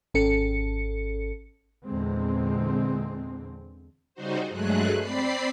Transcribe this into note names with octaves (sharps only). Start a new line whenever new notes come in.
G#1 C#4 A4 C#7
E2 A#2 D3 G#3 C4
C#3 G3 D#4 F#4 C5
G2 F#3 G#3 A3 G#4 F#6
C4 D5 B5 C7